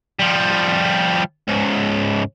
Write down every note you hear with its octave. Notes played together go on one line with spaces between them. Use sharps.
F3 G3
C#2 G#2